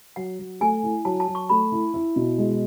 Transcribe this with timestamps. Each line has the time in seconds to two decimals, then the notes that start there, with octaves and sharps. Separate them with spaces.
0.16 F#3 F#5
0.39 F#3
0.61 A3 G#5
0.83 E4
1.05 F#3 A5
1.20 A5
1.27 F#3
1.35 C#6
1.49 A3 B5
1.72 E4
1.94 E4
2.16 B2
2.38 G#3